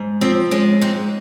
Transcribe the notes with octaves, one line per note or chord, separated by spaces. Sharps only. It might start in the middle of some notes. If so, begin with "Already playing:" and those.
Already playing: G#2
F3 C4
G#3 C#4
G#2 C4